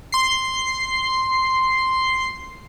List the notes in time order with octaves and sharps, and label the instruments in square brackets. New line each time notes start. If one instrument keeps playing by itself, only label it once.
[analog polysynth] C6 C7